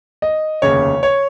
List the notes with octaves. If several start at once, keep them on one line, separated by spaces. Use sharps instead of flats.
D#5
F1 D#2 C#3 C#5
C#5